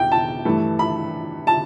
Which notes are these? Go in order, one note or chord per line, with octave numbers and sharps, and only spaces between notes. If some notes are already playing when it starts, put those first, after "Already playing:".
Already playing: E2 B2 G5
A5
G2 E3 A3
B5
A5